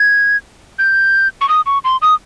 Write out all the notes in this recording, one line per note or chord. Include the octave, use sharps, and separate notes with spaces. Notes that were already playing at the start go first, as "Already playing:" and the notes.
Already playing: G#6
G6
C#6
D#6
C#6
C6
D#6